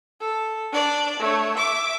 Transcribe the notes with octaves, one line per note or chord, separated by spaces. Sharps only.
A4
D4 D5
A3 C#5
E5 D6